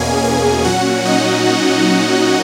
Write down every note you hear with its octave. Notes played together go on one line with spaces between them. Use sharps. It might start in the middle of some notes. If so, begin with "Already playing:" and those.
Already playing: E2 B2 A#3 C#4 G#4 G#5
G#4 G#5
A#2 F#3 C#4 F#4 F#5
D#4 D#5